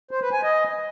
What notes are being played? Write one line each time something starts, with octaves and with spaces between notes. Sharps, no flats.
C5
B4
G#5
D#5